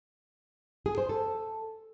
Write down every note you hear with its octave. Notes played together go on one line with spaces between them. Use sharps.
G#4
C5
A4